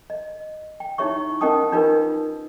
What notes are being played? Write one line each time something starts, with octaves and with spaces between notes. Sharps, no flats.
D#5
G5
D#4 E4 G4 C#5 E5 C#6
C#4 A#4 D#5 G5 A5 D#6
D4 D#4 F4 G4 A#4 B4